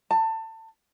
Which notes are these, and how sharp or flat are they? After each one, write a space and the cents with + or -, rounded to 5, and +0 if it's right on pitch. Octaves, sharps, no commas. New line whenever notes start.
A5 +25